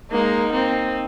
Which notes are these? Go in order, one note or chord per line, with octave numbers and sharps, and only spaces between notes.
G#3 A#3 D#4
A#3 C4